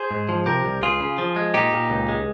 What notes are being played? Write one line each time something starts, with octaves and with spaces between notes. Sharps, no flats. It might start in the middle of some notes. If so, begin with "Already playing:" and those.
Already playing: G#4 C5
G#2
F3
C3 G4 A#4
C2
C#2 F4 G#4
C#3
F3
G#3
A#2 D#4 G4
A#2
C#2
G#3